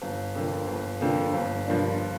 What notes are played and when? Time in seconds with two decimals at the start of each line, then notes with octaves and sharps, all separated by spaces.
0.02 G1
0.35 F2 D3 F3 A#3
0.67 G1
1.01 F2 D3 F3 A#3
1.33 G1
1.66 G2 F3 A#3 D4